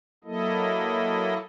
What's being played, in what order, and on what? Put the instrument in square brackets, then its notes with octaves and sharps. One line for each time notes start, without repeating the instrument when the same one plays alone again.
[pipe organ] F#3 A#3 E4 A4 D#5